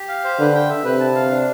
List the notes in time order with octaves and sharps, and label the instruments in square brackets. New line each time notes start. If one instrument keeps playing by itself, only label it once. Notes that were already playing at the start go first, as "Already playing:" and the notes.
Already playing: [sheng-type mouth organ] G4
F5
C5
[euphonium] D3 [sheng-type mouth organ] B4
[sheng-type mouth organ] G5
E5
[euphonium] C3 [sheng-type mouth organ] B4
[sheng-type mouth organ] A5
F5
D4